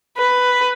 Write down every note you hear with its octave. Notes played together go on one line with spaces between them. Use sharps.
B4